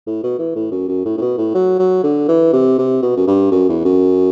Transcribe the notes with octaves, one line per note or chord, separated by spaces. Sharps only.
A2
B2
E3
A2
F#2
F#2
A2
A2
B2
A2
F#3
F#3
D3
E3
C3
C3
B2
F#2
G2
F#2
E2
F#2